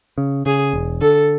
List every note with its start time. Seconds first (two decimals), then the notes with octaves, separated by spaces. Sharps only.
0.18 C#3
0.46 C#3 G#4
0.73 E1
1.01 D3 A4